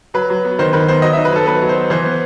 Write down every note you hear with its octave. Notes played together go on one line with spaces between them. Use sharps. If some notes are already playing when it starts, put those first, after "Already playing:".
F#3 B4
F#3
B3
D#3 C5
D#3 B4
B3 C5
F#3 D#5
D#4 E5
B4
F#3 A4
B3 B4
F#3
C5
B3
E3 C5
B3